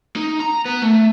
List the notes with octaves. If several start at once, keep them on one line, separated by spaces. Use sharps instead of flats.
D#4
A#5
B3
A3